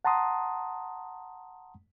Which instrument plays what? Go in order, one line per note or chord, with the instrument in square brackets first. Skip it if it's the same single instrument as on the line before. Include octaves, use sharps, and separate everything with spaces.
[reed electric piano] F#5 A5 A#5 C6 D#6